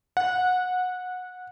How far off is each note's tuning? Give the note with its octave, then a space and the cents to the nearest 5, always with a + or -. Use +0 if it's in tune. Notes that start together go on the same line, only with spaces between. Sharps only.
F#5 -20